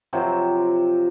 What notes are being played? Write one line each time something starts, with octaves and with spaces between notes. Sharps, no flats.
C3 F3 F#3 C4